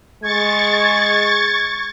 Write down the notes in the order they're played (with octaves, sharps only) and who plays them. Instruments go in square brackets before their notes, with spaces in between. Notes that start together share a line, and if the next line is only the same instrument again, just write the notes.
[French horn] G#3 [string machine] C#6 A6 [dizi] G#6